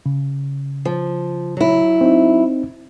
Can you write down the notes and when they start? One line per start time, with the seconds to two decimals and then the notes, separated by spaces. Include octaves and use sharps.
0.06 C#3
0.85 F3
1.57 F#3 E4
2.01 C4 D#4